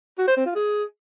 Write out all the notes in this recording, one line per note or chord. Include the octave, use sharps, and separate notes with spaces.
F#4
C5
C4
F4
G#4